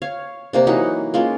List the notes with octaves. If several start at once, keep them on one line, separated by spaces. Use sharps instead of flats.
C#5 F5
C3 A#3 D4
E3 F#3 D#4 F#5
G#3 A#3 C#4 F4